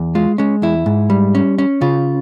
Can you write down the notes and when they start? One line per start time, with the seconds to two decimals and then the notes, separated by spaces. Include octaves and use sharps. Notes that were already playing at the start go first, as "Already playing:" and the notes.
Already playing: E2
0.15 G#3 F4
0.38 G#3 C#4
0.62 E2 E4
0.86 G#2
1.10 G3
1.35 C#4
1.58 C#4
1.81 C#3 F4